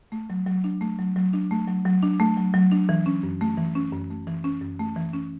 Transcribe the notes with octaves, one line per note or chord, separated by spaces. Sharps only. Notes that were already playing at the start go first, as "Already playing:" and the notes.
A3
F#3
F#3
D4
A3
F#3
F#3
D4
A3
F#3
F#3
D4
A3
F#3
F#3
D4
E3
C#4
F#2
A3
E3
C#4
F#2
A3
E3
C#4
F#2
A3
E3
C#4